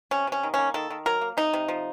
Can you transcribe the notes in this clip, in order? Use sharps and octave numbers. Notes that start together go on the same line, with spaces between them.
C3 C#4
C3 C#4
D#3
A#3 C#4
D#3 A4
D#3
F#3 A#4
A#3
C3 D#4
C3
F3